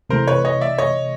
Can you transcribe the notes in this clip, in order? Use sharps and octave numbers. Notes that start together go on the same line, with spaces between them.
C3 E3 A3 A#4 C5
B4 C#5
C#5 D#5
D5 E5
C#5 D#5